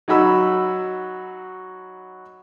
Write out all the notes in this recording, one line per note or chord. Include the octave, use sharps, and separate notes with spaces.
F#3 D#4 F#4 B5 E6